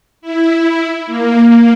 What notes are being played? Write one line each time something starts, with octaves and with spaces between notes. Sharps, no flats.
E4
A#3